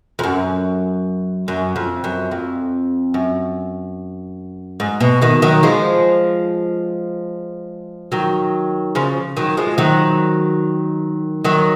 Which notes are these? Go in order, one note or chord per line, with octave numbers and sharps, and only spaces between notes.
F2
F#2
F#2
F2
F#2
F2
F#2
G#2
B2
B2 D#3
D#3 F#3
F3 G#3
D#3 F#3
C#3 F3
D#3 F#3
F3 G#3
D#3 F#3
D#3 F#3